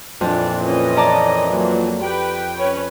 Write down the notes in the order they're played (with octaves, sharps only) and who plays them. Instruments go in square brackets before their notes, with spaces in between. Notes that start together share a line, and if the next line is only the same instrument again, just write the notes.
[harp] F2 [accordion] A#2 E3 [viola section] D4
[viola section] C#4 D#5
[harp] D5 A5 A#5
[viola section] F#3 A#3
[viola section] G4 B4 [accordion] G5
[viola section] C#4 B4 C#5